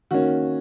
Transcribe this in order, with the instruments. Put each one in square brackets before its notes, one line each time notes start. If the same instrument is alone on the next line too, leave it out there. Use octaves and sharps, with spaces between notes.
[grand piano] D#3 A#3 C#4 F#4